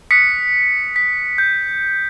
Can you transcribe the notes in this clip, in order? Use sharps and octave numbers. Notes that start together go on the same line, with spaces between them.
D#6 F#6 B6 C#7
B6
G6